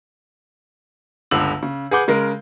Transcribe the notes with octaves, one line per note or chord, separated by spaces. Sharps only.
G1 C#2 D3 E6 F#7
C#3
G#4 B4 F#5 D6 G6
C#3 G#3 A#4